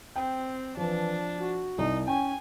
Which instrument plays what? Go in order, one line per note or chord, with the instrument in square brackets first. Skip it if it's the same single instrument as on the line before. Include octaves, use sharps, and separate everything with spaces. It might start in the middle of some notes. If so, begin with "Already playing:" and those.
[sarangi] C4 [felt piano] G5
[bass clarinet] E3 [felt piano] F3 [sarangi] D4
[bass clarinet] F#4
[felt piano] C2 [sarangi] D#4
[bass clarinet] C#4 [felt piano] G5 [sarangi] G#5